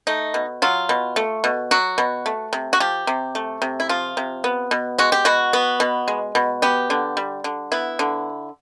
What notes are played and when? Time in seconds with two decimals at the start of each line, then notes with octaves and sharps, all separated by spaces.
0.07 A3 D#4
0.34 B2
0.62 F#3 F4
0.89 B2
1.16 A3
1.44 B2
1.71 F#3 F#4
1.98 B2
2.26 A3
2.53 C3
2.73 F#4
2.80 F3 G4
3.07 C3
3.35 A3
3.62 C3
3.80 E4
3.89 F3 F4
4.17 C3
4.44 B3
4.71 B2
4.98 G#3 F#4
5.12 G4
5.25 B2 F#4
5.53 B3
5.80 B2
6.08 G#3
6.35 B2
6.62 B3 G4
6.90 D3
7.17 G3
7.44 D3
7.72 B3 E4
7.99 D3